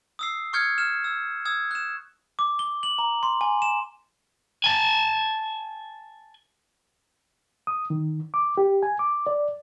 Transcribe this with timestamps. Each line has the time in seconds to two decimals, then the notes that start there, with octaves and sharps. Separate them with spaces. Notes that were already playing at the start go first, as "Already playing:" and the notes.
0.19 D#6 E6 C7
0.53 C#6 D#6 F6 G6 G#6 C#7
0.78 F6 E7
1.04 E6
1.45 D#6 E6 G#6
1.71 F#6 E7
2.39 D6
2.59 G7
2.83 F#7
2.98 A#5
3.23 C6
3.41 G#5
3.62 E7
4.64 G#5 A5
7.67 D#6
7.90 D#3
8.34 D6
8.57 G4
8.83 G#5
8.99 D6
9.27 D5